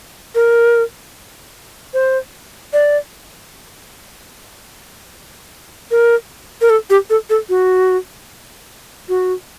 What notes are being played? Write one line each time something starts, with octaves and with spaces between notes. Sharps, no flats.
A#4
C5
D5
A#4
A#4
A4
G4
A4
A4
F#4
F#4